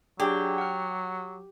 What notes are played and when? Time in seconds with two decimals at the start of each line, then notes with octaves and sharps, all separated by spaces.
0.20 F#3 D4 G4 G#4 D5
0.58 F#5 F6